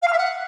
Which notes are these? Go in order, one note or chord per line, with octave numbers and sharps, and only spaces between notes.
F5
F6
E5
F#5